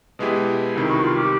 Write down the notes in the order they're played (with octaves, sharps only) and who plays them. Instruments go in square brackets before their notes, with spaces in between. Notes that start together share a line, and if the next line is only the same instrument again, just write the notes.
[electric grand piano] B2 G#3 B3 E4 G4
[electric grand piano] C2 C3 D#3 [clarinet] E4
[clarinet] F#4
F4
G4